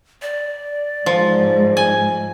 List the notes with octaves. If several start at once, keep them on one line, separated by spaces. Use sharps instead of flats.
D5
G#2 F3
G#5